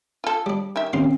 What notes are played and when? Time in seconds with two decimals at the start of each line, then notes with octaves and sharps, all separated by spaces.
0.24 F4 A4
0.46 G3 D4
0.76 D#3 G4 E5
0.93 D#2 C4 C#4 F5 C6